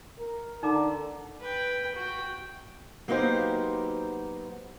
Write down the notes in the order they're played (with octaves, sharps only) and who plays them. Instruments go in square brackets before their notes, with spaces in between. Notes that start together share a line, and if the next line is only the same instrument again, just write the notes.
[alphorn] A#4
[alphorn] D3 [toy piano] D#4 A#5 D6
[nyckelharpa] B4 G5
F#4 G5
[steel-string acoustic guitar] F#3 A#3 B3 D#4 G4 C5